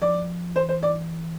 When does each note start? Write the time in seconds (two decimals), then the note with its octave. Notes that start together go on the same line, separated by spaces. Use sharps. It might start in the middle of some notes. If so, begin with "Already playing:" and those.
0.01 F3 D5
0.55 E3 C5
0.69 C5
0.83 D5